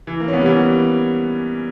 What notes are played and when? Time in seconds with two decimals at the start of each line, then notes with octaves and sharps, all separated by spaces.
0.07 E3
0.20 A#3
0.28 C#4
0.33 B3
0.41 G3
0.46 E3
0.59 G3